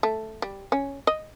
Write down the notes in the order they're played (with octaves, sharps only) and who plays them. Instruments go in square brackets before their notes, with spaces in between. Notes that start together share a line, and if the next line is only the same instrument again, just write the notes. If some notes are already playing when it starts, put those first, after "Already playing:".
[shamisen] A3
G3
C#4
D#5